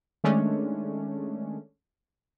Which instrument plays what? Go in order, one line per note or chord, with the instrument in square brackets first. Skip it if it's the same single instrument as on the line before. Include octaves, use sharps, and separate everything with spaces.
[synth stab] D#3 G#3 A3 C#4 D4